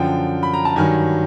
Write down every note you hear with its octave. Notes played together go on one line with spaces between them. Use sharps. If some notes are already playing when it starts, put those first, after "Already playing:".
Already playing: F#2 D3 F3 G5
B5
A#5
A5
G2 D#3 F#3 G#5